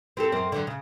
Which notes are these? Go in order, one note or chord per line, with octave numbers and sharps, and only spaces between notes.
C4 G4 A4
F#2 A#3 C4
D3 F3 F#3
C#3